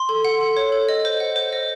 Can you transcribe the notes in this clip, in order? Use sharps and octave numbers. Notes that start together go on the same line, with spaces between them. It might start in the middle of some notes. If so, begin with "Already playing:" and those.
Already playing: C6
A4
F#5
A4
C#5
A4
D#5
C5
F#5
C5
D#5